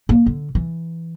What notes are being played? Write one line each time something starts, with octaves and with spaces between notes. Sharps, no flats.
A#3
D3
E3